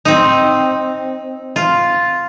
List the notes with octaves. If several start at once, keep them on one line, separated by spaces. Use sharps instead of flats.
C4 D#4
F4